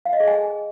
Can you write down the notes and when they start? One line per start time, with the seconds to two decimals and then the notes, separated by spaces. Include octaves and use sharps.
0.05 F5
0.13 D#5
0.20 G#4
0.28 G#5